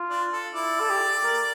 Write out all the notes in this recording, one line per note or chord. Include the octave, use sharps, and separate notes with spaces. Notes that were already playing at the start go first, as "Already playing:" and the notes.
Already playing: F4
D4
A4
E4 D5
A4
G4
A#4